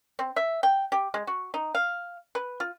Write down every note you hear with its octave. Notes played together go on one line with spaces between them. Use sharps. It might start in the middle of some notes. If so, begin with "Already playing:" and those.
C4
E5
G5
G4
G#3
F#4
D#4
F5
B4
F4